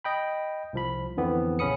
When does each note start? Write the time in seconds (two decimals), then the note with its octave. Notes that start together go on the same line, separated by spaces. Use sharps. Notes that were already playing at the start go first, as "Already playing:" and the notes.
0.04 D#5 G5 B5
0.73 C2 F3 B5
1.17 F2 D3 E3 B3 C4
1.59 A#1 C#3 C#4 B5 D#6 C#7